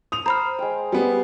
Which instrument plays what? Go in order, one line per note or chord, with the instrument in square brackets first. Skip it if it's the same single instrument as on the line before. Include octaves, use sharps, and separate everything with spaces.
[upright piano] D#6 F7
[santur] C5 [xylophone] A#5 B5 F6
[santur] G#3 G5
[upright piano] G3 B3